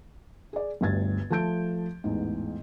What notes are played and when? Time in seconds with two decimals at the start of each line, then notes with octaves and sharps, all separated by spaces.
0.53 G#4 D5
0.81 G1 D2 G2 G#6 A6
1.30 F3 A3 A5 G6 D7
2.04 A1 E2 G#2